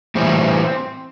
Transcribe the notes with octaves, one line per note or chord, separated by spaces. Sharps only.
A2 E3 G3 C4